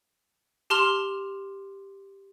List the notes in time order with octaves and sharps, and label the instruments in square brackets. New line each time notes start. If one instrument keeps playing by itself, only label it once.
[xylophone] G4 A5 C6 F6 F7